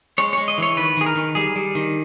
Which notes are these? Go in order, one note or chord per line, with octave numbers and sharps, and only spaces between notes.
G#3 C#5
G#3 C#5
D#5
E3 C#5
D#3 B4
D#3 G#4
A#4
D#3
G3 G#4
G3
D#3